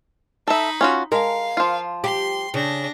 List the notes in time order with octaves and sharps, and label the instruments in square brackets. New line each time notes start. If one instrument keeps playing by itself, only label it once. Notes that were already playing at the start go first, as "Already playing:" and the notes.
[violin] D#4 B5 [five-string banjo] A4 E5
[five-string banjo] C#4 F4 F#4
[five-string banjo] G#3 [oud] A#4 [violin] F5
[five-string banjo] F3 F4
[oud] G4 [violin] C6
[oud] C#3 [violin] D4 A#6